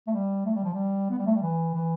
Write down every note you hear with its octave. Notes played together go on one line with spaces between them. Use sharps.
A3
G3
A3
G3
F3
G3
B3
G3
A3
G3
E3
E3